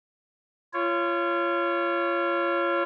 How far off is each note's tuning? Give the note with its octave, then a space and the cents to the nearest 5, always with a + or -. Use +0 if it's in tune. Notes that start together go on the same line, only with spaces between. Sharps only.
F4 -30 C#5 +0